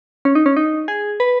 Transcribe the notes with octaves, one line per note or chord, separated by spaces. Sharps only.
C#4
D#4
C#4
D#4
G#4
B4